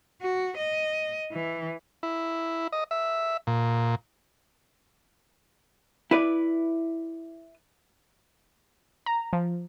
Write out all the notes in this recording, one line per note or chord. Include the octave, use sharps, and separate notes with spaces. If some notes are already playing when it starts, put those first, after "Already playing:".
F#4
D#5
E3
E4
D#5
E5
A#2
E4 B4 D5
A#5
F3